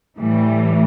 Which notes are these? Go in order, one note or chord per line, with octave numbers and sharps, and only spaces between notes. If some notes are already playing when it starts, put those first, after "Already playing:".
A2 E3 G3 A3